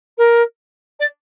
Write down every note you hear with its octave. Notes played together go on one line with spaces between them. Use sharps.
A#4
D5